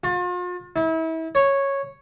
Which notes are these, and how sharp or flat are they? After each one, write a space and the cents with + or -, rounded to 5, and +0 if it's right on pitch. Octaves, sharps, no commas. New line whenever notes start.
F4 +40
E4 -35
C#5 -5